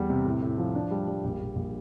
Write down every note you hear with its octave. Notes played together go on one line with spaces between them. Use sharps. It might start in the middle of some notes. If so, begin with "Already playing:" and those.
Already playing: E2 G3
C3
A2
A2
F3
D4
G3
G3
A#1
A#1
A#1